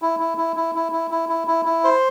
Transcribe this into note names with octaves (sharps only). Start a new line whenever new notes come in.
E4
E4
E4
E4
E4
E4
E4
E4
E4
E4
C5